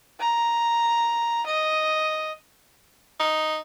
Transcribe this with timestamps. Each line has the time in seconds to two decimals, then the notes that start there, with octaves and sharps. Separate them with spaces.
0.19 A#5
1.46 D#5
3.20 D#4